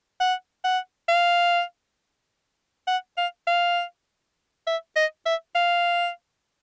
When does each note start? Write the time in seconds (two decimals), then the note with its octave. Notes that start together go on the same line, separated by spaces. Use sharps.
0.20 F#5
0.65 F#5
1.09 F5
2.88 F#5
3.18 F5
3.47 F5
4.67 E5
4.96 D#5
5.26 E5
5.55 F5